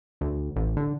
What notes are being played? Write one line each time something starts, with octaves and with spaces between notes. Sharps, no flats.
D2
A1
D3